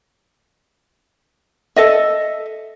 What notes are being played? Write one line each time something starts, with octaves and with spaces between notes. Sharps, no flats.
A4 D#5 E5